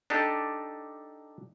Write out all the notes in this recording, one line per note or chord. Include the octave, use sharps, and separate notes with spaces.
D4 D#4 G4 A4